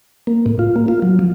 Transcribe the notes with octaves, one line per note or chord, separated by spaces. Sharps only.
A#3
A2
F4
A#3
F4
F#3
F3